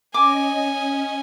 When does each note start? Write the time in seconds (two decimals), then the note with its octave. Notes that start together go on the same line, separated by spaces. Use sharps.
0.14 C#4 D#5 G#5 D6